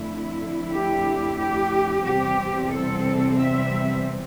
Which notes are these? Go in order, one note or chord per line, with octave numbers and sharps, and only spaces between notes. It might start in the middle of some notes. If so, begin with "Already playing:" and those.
Already playing: F2 D3 A3 E4
G4
G4
E2 C3 G3 C4 G4
A4
E5